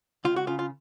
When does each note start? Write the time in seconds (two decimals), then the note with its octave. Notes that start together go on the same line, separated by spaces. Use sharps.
0.25 C#2 F4
0.36 F#4
0.47 C#3 F4
0.59 F4